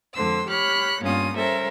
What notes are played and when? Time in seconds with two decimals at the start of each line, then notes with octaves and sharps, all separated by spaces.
0.13 F2 D3 G#3 C5 E6
0.47 G4 C#5 B5 F6 F#6
1.00 G2 A#2 B3 C#4 F4 D#6
1.35 G3 C#4 A4 A#4 C5 E5